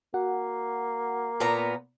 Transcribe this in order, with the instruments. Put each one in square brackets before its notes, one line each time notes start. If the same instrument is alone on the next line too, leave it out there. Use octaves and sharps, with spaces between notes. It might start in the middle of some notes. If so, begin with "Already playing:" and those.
[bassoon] A#3 [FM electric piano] F#4 F#5
[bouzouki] A#2 B3 A#5